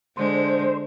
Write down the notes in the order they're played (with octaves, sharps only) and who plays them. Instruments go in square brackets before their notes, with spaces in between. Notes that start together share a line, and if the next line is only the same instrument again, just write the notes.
[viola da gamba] D3 G#3 [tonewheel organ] C5